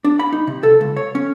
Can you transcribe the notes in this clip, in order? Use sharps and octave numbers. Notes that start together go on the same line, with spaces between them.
D4
B5
D#4
C3
A4
C#2
C#5
C#4